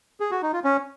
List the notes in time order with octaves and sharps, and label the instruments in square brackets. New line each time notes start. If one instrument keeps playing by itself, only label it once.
[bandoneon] G#4
F#4
D#4
F4
C#4